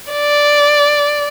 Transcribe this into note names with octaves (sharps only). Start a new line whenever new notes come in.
D5